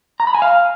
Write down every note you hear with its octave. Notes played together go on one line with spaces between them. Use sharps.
A#5
B5
G#5
F5